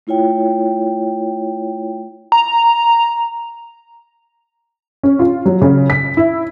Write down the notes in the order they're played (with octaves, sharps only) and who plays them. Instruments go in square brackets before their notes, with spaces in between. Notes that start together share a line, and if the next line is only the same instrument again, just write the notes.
[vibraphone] A3 E4 F4 C#5 G5
[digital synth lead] A#5
[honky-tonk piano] C#4
F4
F#3
C#3
B6
E4